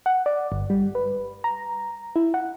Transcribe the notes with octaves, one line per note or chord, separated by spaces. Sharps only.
F#5
D5
G1
G3
B4
A#5
E4
F#5